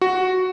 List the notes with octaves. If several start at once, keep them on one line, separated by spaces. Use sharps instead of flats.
F#4